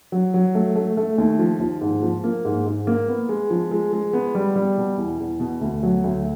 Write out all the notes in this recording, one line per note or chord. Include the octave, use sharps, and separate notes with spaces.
F#3
F#3
A3
A3
A3
D#2
F3
D#2
G#2
F3
A#3
G#2
G#2
A#3
B3
G#3
F3
G#3
G#3
B3
G3
G3
B2
E2
E2
B2
D2
F#3
D2